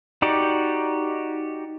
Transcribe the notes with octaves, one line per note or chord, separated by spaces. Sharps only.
D#4 F#4 G4 D5